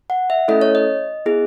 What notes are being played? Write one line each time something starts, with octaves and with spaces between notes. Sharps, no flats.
F#5
E5
A3 C#4 E4 A4 D#5
C#5
D#5
B3 E4 G#4